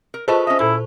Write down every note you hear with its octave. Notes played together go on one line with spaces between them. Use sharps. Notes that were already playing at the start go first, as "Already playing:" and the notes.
A#4
F4 G#4 A4 B4 C5 D#5 A5 C#6
C#4 D#5 E5
A#2 E4 A4 B5